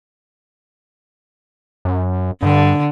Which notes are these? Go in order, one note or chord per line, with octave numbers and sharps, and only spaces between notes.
F#2
G2 D3